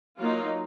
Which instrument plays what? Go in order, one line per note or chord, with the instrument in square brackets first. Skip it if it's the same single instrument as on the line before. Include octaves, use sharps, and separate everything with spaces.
[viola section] F#3 A#3 D#4 F4